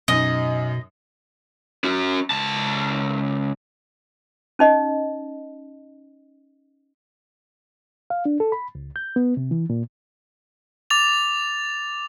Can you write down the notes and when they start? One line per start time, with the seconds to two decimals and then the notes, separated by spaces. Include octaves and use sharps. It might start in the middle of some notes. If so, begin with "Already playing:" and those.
0.08 F#2 B2 D#4 D#5
1.84 C#4 F#4
2.31 C#2 A5
4.59 C#4 D#4 D#5
8.10 F5
8.25 D4
8.40 A4
8.52 B5
8.75 C#2
8.96 G6
9.16 B3
9.37 C3
9.51 E3
9.70 A#2
10.90 D6 A6 F7